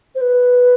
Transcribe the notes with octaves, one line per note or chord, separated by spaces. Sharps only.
C5
B4